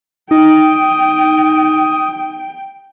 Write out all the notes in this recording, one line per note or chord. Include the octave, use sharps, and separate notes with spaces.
D#4 G5 D#6